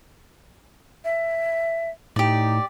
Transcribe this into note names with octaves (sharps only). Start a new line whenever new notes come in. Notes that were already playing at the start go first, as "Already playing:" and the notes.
E5
A2 D#4 G4 D5